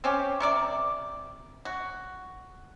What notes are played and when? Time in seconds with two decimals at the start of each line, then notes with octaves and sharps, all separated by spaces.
0.04 C4 C#4 G4
0.40 C3 A#4 D5
1.65 F#4